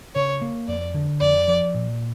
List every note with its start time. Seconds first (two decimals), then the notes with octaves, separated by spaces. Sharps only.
0.15 C#3 C#5
0.42 A#3
0.68 F2 D5
0.94 D3
1.21 F2 D5
1.48 F3
1.74 A#2